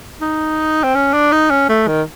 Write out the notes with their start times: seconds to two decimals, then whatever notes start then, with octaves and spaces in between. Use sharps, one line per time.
0.22 D#4
0.83 C4
0.95 C#4
1.14 D4
1.32 D#4
1.50 C#4
1.69 A3
1.88 D#3